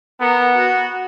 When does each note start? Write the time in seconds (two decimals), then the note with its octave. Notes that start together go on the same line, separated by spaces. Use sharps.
0.21 B3 A#4
0.55 F#4